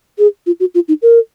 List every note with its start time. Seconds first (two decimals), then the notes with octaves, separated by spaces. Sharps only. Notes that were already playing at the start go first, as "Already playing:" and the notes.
0.19 G#4
0.47 F4
0.60 F#4
0.75 F4
0.88 D#4
1.02 A#4